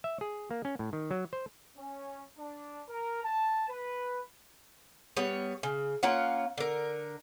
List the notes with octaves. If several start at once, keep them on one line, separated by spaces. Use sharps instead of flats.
E5
G#4
A#3
C#4
A2
D#3
F#3
C5
C#4
D4
A#4
A5
B4
G3 B3 C#5
C#3
A#3 C#4 F4 F#5
D3 A#4